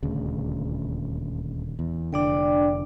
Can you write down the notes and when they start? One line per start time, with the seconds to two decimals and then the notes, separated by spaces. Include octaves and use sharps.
0.03 D#1 D2 C#3
1.79 E2
2.13 F1 D3 D4 D5 G5